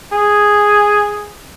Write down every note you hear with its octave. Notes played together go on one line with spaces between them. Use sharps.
G#4